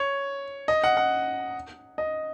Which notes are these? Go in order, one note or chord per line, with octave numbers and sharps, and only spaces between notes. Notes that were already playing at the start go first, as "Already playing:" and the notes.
Already playing: C#5
D#5
F#5
F#5
D#5